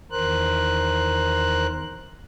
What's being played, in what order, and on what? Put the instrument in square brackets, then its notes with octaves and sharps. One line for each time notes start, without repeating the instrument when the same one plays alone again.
[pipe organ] E2 D#3 A#4 C5 F#6